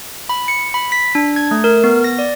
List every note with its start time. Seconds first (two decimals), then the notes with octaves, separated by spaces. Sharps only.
0.29 B5
0.48 C#7
0.74 B5
0.92 B6
1.15 D4
1.36 G#6
1.51 A3
1.64 A#4
1.84 B3
2.04 A#6
2.19 D5